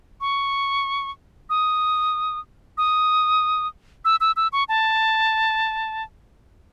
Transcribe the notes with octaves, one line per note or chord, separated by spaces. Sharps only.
C#6
D#6
D#6
E6
E6
E6
C#6
A5